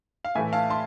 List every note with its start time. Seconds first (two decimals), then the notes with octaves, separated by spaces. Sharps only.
0.25 F5
0.35 A2 E3 A3 E5 G#5
0.53 F5 A5
0.70 A5 C6